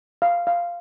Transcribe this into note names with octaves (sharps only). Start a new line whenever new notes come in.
F5
F5